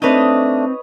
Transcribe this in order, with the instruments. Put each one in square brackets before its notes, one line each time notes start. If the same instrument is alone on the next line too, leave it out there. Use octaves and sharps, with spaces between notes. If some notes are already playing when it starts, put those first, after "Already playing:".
[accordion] A3 D4 [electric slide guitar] C4 D#4 [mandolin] B4 C#5 D#5